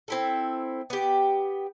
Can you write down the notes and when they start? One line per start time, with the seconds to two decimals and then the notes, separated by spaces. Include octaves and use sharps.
0.08 C4 E4 A4
0.90 B3 G4